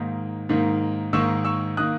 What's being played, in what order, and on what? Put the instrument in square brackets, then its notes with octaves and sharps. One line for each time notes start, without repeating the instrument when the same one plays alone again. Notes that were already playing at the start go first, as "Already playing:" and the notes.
Already playing: [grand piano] G#2 D#3 A#3
G#2 D#3 A#3
G#2 D#3 A#3 C#6 E6
C#6 E6
D#3 A#3 D#6 F#6